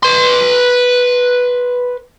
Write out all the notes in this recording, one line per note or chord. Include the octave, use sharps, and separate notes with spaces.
B4 C6